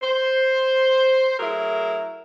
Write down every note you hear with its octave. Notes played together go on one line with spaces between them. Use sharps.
C5
F#3 A3 E4 G#4 A#4